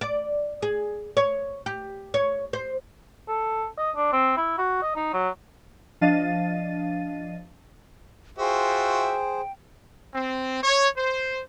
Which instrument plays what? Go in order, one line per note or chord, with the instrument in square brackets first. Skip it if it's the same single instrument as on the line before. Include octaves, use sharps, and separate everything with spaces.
[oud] D5
G#4
C#5
G4
C#5
C5
[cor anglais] A4
D#5
D4
C4
E4
F#4
D#5
D#4
F#3
[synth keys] F3 D4 D#5 F5 A6 D#7
[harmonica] F4 F#4 E5 [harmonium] G#4 C5 [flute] G5
[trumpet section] C4
C#5
C5